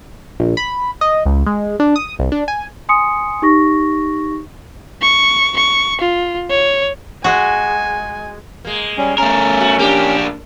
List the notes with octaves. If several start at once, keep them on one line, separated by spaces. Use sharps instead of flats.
A#1
B5
D#5
C#2
G#3
D4
D#6
C2
D4
G#5
G#5 C6 D#6 C#7
D#4 G4 C#6 A#6
C#6
C#6
F4
C#5
G#3 F#4 G#5
G#3 A#3
G3 C#4
A3 C#4 A#4
F#4
A#3 D4 G4 A#4